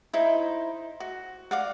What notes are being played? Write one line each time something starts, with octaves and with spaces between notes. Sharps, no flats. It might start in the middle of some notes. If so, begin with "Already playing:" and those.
D#4 E4 C5
F#4
D5 F5 F#5